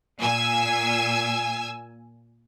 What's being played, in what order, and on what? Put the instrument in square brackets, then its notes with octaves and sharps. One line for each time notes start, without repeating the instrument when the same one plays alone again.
[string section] A#2 G#5 E6